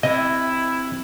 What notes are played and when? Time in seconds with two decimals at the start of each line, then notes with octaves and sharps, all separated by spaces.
0.03 C3 E4 D#5